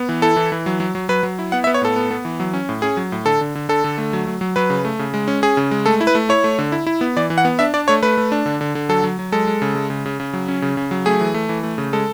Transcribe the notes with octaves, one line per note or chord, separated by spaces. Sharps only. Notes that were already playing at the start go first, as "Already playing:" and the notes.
Already playing: B3
E3
E4 A4
E3
E3
F#3
F#3
F#3
F#3 B4
F#3
E4
B3 F#5
E5
B3
C#5
A2 A4
B3
B3
E3
F#3
C#4
A2
C#4 G#4
F#3
A2
D3 A4
D3
D3
D3 A4
D3
A3
F#3
F#3
F#3
F#3 B4
C#3
A3
C#3
G#3
C#4
C#4 G#4
C#3
G#3
A3 A4
E4
B4
A3
E4 C#5
A3
D3
E4
E4
B3
E3 D5
E3
F#5
B3
D4 E5
D4 D5
A3 C#5
A3 B4
A3
D4
D3
D3
D3
F#3 A4
F#3
F#3
G#3 A4
G#3
C#3
G#3
C#3
C#3
C#3
F#3
C#4
C#3
C#3
F#3
A3 G#4
E3
A3
E3
A3
C#3
G#3 A4